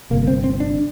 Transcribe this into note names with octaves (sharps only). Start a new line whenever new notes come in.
G1 F2 C3 A#3
C4
C4
D4